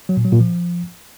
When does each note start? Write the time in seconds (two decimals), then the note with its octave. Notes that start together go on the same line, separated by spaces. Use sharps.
0.09 F#3
0.17 A#2
0.25 F#3
0.32 A#2
0.40 F3